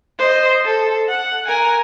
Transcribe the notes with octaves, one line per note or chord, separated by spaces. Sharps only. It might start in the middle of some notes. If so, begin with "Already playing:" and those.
C5 D#5
A4
F#5
A#4 G#5